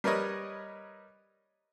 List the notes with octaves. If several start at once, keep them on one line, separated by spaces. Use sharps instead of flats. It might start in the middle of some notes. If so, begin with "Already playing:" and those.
G3 A#4 B4 C#5 D#5